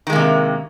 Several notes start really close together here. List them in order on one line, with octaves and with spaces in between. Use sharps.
D#3 G#3 A#3 C3